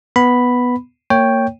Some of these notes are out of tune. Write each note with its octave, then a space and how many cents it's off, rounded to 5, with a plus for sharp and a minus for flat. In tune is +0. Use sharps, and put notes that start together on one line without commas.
B3 +0 B5 +0
A#3 -20 C#5 +0 G5 +0